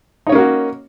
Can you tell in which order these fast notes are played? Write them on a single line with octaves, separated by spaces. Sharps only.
D#4 C#5 C#4 A#3 F#4